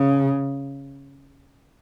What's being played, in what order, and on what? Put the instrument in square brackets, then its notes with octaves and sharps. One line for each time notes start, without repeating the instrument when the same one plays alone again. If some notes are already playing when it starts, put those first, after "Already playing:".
Already playing: [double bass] C#3